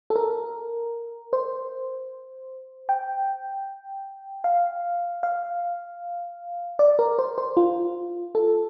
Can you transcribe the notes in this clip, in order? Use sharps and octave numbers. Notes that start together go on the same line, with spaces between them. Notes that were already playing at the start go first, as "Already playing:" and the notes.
A4
A#4
C5
G5
F5
F5
D5
A#4
C5
C5
F4
A4